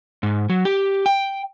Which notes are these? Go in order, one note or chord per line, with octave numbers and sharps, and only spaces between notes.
G#2
F#3
G4
G5